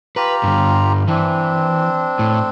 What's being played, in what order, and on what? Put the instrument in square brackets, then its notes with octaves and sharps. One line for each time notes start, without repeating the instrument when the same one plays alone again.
[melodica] F4 G4 A#5 [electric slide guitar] B4
[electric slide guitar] G2 D3
[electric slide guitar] E3 [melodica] C4 D4
[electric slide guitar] A2